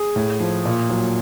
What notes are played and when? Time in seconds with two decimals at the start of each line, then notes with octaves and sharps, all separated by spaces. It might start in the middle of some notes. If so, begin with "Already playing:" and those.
Already playing: G#4
0.16 A2
0.40 F3
0.65 A#2
0.90 F#3